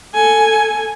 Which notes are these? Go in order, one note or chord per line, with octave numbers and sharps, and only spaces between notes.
A4 G#5